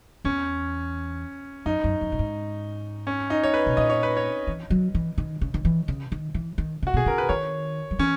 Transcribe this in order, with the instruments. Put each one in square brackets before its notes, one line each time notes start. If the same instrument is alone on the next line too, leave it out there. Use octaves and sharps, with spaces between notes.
[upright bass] E2 [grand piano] C#4
[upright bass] F#2 [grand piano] D#4
[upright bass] F#2
F#2
A#2
G#2
[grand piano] C#4
D#4
C#5
B4
[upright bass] B2
[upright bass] A#2 [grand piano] D#5
[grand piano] C#5
B4
C#5
[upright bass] E3
F#3
E3
D#3
C#3
D#3
E3
C#3
D#3
E3
D#3
[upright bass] C#3 [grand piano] F#4
[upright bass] B2 [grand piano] G#4
[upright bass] C#3 [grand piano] A#4
[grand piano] B4
[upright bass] D#3 [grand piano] C#5
[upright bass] F#3
[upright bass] E3 [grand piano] C#4